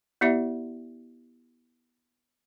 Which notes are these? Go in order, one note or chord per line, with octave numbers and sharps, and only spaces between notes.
B3 E4 G4 D5 E5